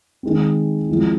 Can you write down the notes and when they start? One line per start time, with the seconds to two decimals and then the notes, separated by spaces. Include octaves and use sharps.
0.23 D#3 G#3 C4
0.89 F3 G#3 C4 E4